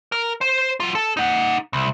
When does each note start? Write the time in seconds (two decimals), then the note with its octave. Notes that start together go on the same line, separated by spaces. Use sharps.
0.12 A#4
0.41 C5
0.80 F#3 F4
0.95 A4
1.17 D#4 F#5
1.73 C2